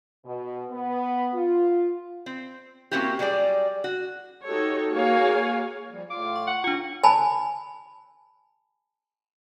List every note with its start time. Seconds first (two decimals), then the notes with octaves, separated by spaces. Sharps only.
0.25 B2
0.70 B3
1.34 F4
2.26 C4
2.91 A#3 C4 C#4 E4 F#4 G4
3.19 F#3 G3 G#4 A4 D5
3.84 F#4
4.45 D#4 F#4 G4 A4 C#5
4.91 A#3 F#4 G#4 C#5 F5 G#5
5.90 F3 G3
6.10 A2 F4 F5 D6
6.36 C#6
6.47 F#5
6.64 C#3 C#4 D4 F4 C#6
7.04 G#5 A5 B5